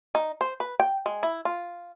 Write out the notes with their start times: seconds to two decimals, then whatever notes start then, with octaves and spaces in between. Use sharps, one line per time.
0.15 D#4
0.41 C5
0.60 B4
0.80 G5
1.06 G#3
1.23 E4
1.45 F4